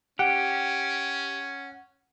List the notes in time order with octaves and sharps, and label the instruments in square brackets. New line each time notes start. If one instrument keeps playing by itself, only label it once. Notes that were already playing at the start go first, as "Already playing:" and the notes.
[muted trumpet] C#4 [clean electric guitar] G4 [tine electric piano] F#5